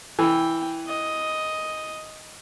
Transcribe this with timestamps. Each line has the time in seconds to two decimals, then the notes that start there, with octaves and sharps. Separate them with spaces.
0.19 E3 G5
0.87 D#5